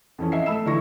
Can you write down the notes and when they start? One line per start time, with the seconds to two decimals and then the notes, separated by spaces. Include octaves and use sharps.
0.18 F2 E3 C#4
0.32 D#5 E5 C7
0.46 A3 B5 E6 E7
0.66 D3 E3 E4 C#6 A#6